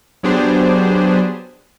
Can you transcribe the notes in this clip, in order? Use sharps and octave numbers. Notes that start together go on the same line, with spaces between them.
F#3 B3 D4 G4 G#4 C5